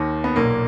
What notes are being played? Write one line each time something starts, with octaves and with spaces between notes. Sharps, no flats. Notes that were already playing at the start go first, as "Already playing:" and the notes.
Already playing: D#2 D#3
B3
B1 A#2 A#3